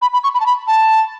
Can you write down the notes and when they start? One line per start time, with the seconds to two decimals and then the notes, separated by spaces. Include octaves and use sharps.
0.02 B5
0.13 B5
0.24 C#6
0.34 B5
0.40 A5
0.46 B5
0.67 A5